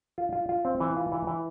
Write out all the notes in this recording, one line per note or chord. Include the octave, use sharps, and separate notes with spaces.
F4
F4
F4
C4
E3
F4
E3
E3